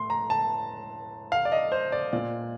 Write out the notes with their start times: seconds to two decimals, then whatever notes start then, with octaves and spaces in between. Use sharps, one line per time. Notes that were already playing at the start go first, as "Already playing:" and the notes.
Already playing: A2 C6
0.10 A#5
0.30 A5
1.32 F5
1.45 D5
1.52 D#5
1.72 C5
1.92 D5
2.13 A#2 D5